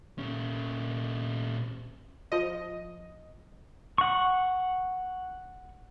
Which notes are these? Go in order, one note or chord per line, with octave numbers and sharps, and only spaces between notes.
A#2 C#4
F3 D#5
F#5 C#6